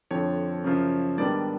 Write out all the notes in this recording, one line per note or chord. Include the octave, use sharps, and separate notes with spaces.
F2 D3 F3 C#5
F#2 C#3 F3
G#2 D#3 G3 B3 D4 D5